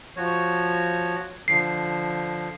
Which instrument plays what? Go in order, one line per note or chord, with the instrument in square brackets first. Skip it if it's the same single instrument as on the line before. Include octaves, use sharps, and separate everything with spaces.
[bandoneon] F3 F#4 C#5
[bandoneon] D3 F3 [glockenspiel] C7